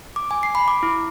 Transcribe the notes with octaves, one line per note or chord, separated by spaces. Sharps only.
D6
G#5
C7
B5
D6
E4